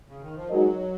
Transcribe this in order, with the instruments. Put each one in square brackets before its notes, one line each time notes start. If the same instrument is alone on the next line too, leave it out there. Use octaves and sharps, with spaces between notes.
[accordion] C#3
D#3
F3
[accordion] F#3 [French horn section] G#3 D#4 F#4 A#4 D#5